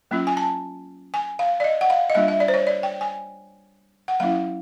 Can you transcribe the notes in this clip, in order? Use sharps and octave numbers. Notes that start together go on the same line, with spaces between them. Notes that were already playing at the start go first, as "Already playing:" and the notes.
F#3 A#3 C#4 F4
G#5
A5
G#5
F5
D5
D#5
F#5
F5
D#5
G3 A#3 D4 F4 E5
E5
D5
C5
C#5
D5
G5
G#5
F#5
F#3 A#3 C#4 E4 F5